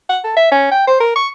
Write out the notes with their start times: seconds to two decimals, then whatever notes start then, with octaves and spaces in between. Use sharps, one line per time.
0.09 F#5
0.24 A4
0.37 E5
0.52 C#4
0.72 G5
0.87 C5
1.01 A#4
1.16 C#6